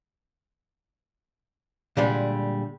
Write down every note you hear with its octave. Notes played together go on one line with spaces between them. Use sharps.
A#2 D3 G3 G#3